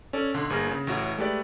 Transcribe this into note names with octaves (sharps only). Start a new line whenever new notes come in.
C#4 A4 D5
B1 D3 C6
G1 A#3 G#4 F6 A#6
C#3
A1 A2 F#4 C#5
G#3 A3 G4 B4 D5